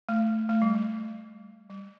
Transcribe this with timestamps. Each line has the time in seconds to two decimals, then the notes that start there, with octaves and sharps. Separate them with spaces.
0.09 A3
0.49 A3
0.62 G3
0.75 G3
1.70 G3